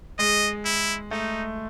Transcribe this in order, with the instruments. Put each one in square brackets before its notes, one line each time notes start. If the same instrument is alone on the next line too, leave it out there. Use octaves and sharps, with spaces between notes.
[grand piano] G#3 [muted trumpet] D#5
[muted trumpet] E4
[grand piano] A3 [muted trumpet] D#4